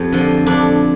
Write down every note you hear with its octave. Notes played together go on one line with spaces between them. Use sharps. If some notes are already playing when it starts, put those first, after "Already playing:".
Already playing: F2 G4
D3 F3
F2 D4